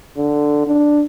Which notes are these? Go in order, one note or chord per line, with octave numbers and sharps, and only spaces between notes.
D3
D4